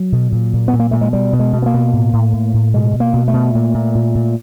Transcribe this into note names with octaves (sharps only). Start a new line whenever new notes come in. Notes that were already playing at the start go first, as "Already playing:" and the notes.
Already playing: F#3
B2
A#2
A#2
B3
A#2
A#3
A#2 A3
G#3
B2 G3
B2
G#3
B2
B3
A#3
B2
A2
A2
A2
A2
B2 G#3
B2
A#3
B2
A3
B2
A#2
A#2
A#2
A#2